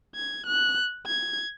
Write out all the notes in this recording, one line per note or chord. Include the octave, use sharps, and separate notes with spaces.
G#6
F#6
G#6